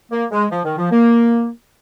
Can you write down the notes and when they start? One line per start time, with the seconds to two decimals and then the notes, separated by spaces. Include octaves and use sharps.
0.12 A#3
0.31 G#3
0.51 F3
0.65 D#3
0.78 F3
0.92 A#3